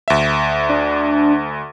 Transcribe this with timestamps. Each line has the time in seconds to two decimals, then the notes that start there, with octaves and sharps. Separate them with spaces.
0.08 D2 E5
0.69 D4